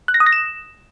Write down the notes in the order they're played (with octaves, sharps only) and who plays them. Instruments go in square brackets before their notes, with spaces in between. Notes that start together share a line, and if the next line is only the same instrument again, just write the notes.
[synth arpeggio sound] F#6
A#6
D#6
A#6
E7